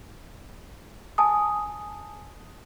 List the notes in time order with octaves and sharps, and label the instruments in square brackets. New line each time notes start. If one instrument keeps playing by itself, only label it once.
[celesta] G#5 A5 D#6